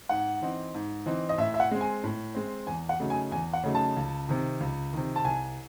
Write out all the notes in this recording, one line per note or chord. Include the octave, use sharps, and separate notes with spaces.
G#2 F#5
E3 C4 D#4
G#2
E3 C4 D#4
D#5
A2 E5
E5
F#5
G#3 C4
G#5
A2
G#3 C4
E2 G#5
F#5
C#3 F#3 A3 D#4
G#5
E2 G#5
F#5
C#3 F#3 A3 D#4
A5
C#2
C3 D#3
C#2
C3 D#3
A5
C2 G#5